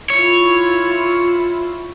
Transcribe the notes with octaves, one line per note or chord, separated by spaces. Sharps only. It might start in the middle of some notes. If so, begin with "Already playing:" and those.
E4 F4 C#5